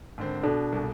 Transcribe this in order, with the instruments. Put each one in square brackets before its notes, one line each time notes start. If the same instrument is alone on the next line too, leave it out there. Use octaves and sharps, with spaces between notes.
[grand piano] G#1 D3 C4
[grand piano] B2 [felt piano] D4 [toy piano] A4
[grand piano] C2 B2